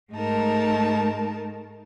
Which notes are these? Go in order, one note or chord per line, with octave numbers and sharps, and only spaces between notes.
G#2 G#3 A3 D#4 A#4 A5